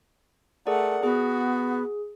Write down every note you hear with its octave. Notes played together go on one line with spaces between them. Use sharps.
A3 G#4 A#4 D5 F#5
B3 F#4 G#4